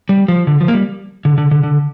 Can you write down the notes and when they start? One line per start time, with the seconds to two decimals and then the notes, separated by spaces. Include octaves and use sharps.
0.09 G3
0.28 F3
0.47 D3
0.61 F3
0.68 A#3
0.73 G3
1.25 D3
1.38 D3
1.51 D3
1.63 D3